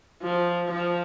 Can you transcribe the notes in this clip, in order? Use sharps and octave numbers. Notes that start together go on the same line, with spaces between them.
F3
F3